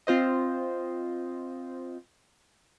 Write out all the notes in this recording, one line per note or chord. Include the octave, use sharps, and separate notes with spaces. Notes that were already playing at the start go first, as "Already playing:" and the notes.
C4 F4 C5 D#5